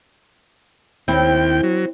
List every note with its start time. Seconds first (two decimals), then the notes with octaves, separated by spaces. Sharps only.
1.08 D#2 C4 E4 G5
1.63 F#3